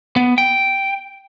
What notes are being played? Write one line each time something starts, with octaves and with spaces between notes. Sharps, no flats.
B3
G5